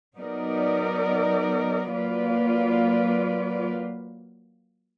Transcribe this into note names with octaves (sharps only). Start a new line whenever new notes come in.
F#3 B3 D#4 A#4 D5
F#3 A#3 F4 B4 D5